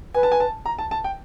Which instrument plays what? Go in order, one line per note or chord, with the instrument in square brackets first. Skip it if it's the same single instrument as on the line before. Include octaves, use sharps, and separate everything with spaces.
[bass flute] B4 [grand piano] G#5
[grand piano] A5
G#5
A5
A#5
A5
A5
G5